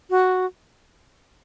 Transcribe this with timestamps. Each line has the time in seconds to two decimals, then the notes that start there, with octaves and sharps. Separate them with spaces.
0.10 F#4